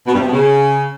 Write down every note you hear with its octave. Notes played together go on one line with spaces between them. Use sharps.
B2
G2
C3
B2
C#3